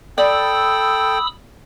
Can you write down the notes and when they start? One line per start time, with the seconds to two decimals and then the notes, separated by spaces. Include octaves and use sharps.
0.18 A4 D5 G5 B5 D#6 E6